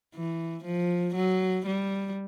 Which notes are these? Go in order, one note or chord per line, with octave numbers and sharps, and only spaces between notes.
E3
F3
F#3
G3